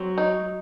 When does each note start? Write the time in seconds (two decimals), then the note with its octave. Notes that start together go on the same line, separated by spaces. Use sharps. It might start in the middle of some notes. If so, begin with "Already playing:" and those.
Already playing: F#3 C4
0.18 D#4